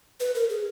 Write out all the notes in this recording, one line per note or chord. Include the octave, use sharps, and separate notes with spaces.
B4
A#4
G#4